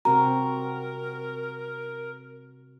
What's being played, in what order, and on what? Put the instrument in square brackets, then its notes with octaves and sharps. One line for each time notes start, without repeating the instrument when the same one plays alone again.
[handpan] C3 C4 F#4 [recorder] A#4 [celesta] A#5